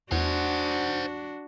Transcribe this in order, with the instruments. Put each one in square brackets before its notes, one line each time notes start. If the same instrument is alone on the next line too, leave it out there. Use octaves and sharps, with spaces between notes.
[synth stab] E2 [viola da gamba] D4 F#4 [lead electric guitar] C5 F#5